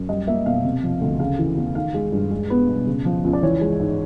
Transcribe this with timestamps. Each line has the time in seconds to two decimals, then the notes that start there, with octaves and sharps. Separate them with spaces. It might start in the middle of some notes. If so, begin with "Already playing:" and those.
Already playing: F#2
0.09 G3 D#5
0.27 A#3 E5
0.46 B2 F5
0.64 C3
0.83 F3
1.01 D2
1.19 C#3 F5
1.38 E3
1.57 E2
1.75 D#3 F5
1.94 G#3
2.12 G2
2.31 G#3
2.50 B3
2.68 B2
2.87 C#3
3.05 F3
3.24 C#2
3.33 D5
3.43 E3 C#5
3.61 G#3
3.80 G#2